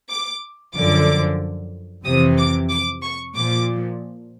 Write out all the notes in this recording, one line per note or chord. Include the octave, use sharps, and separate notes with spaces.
D6
F#2 D3 F3 D6
F2 C3 E3 D#6
D6
D6
C#6
A#2 F3 D6